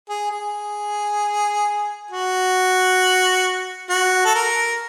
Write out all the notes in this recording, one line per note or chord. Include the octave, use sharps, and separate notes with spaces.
G#4
G#4
F#4
F#4
A4
A#4